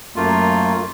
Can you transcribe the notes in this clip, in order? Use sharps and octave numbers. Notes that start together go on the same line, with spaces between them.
F#2 A3 A#3 F4